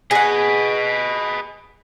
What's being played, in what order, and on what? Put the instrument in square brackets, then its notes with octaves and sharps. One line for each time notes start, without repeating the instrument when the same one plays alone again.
[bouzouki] G#4 F#5 [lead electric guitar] B4 D#5